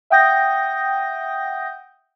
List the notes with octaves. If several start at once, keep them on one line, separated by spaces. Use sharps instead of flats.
E5 F#5 G5 D#6 G6 A#6